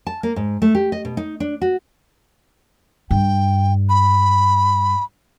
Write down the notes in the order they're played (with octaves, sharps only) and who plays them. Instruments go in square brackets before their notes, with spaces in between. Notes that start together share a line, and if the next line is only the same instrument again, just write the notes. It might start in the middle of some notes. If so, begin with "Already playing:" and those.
[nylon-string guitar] A5
A#3
G#2
A3
G4
D#5
B2
D#4
D4
F#4
[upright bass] G2 [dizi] G5
[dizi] B5